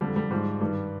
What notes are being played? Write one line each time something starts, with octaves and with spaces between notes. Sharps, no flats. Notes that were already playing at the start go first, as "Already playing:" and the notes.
F2 D3 G3
G3
G#2 F3 G3
G2 D#3 G3